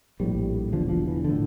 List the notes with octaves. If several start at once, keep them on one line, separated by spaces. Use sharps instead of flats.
A#1 A2 G3
E1 E2 D3 F3
F3
E3
D3
A2